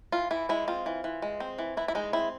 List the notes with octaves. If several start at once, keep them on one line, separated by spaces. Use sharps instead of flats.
E3 F4
E3 E4
G#3 E4
C4 F4
E3
E3
G#3
C4
E3
E3 E4
E4
G#3 D#4
C4 E4